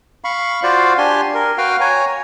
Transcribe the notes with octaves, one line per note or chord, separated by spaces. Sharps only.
F5 B5 C#6
F4 F#4 C5 D5 F5
D4 G4 G#5 C6
A#4
F#4 B4 F5 G5 F6
C#5 G#5 A#5